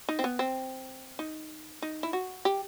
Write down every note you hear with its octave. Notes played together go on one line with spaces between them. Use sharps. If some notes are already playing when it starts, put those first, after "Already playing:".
D#4
C4
B3
C4
D#4
D#4
E4
F#4
G4